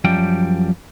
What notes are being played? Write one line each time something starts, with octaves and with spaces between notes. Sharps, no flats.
F#2 F3 G3 G5